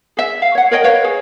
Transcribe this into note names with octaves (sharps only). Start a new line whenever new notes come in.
G#4 E5
F5
C#5 F#5
A#4 C#5 D#5 G5
A#4 B4 C#5 F5
G#4